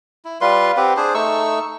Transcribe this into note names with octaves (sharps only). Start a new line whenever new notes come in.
E4
G3 F4 B4 C6
C4 G4 B4 F#5
D4 G#4 C5
A3 D#4 C#6 E6